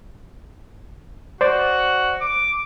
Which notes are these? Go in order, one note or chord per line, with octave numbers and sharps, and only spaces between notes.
F#4 C5 D5
D6